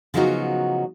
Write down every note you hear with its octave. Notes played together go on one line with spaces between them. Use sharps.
C#3 F3 F#3 B3 D#4 F#4